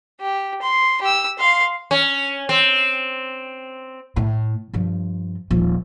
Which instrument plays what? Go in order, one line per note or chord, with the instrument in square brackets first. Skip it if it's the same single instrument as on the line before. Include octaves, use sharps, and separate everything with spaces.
[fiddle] G4
C6
G4 E6
F5 C6
[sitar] C#4
C4
[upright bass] A2
G2 F3
D#1 F3